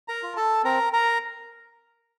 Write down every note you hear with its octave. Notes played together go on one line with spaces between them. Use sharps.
A#4 A#5
F4
A4 A5
C4 A#4 A#5
A#4 A#5